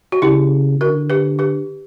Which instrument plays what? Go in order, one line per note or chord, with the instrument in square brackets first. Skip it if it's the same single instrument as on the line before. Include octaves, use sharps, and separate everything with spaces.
[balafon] F#4
[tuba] C#3 [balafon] E4 G4
[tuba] D3 [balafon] F#4 A#4
[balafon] G4 B4
G4 B4